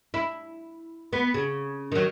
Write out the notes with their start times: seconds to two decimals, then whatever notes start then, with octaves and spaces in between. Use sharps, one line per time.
0.14 E4
1.13 B3
1.34 C#3
1.92 D#3 F#3